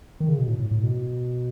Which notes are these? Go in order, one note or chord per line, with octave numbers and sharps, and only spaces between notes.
D#3
C#3
B2
A2
A2
A2
B2